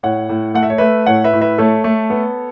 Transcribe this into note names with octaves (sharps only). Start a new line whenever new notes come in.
A2 C#5 F#5
A2
A3 F#5
E5
C#5
A3 B4 E5
A2 C#5 F#5
B4 E5
A2
B4 E5
A3 A4 C#5
A3
B3